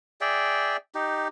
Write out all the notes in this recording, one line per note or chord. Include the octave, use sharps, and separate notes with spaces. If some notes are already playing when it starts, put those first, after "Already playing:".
G#4 D5 E5 G5
D#4 G4